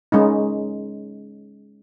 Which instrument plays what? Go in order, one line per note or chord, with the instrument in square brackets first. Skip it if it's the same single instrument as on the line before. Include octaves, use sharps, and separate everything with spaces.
[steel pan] G#3 C#4 D#4